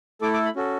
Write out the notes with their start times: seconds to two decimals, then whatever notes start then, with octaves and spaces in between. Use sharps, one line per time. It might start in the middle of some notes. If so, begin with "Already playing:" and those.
0.21 A3 E4 A4 D6
0.34 D6
0.45 B5
0.56 C#4 F#4 A4